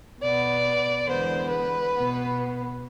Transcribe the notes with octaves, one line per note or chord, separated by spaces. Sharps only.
B2 B3 D5
E2 D3 G#3 B3 C5
B4
B2 B3